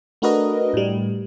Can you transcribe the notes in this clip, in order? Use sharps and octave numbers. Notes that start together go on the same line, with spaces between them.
A3 D4 F#4 A#4 B4 D#5
A2 G3